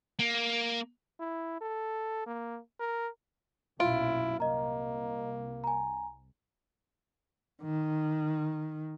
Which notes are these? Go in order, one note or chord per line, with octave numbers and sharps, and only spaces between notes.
A#3
E4
A4
A#3
A#4
B1 F#2 A#2 E4 F4 D7
C2 A#3 D#5 A#5
G#5 A#5
D#3